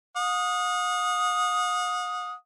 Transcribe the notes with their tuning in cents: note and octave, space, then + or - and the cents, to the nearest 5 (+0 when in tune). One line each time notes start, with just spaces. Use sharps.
F#5 -45 D#6 +0